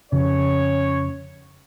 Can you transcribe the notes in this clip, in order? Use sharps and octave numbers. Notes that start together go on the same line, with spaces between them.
F2 C#3 C#4 C#5